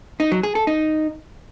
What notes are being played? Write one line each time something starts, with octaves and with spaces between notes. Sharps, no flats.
D#4
F#3
G#4
A4
D#4